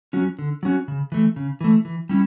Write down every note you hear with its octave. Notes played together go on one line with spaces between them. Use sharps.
F#3 C#4 F#4
D3
F#3 C#4 F#4
C#3
E3 A3
C#3
E3 A3
E3
G3 C#4 E4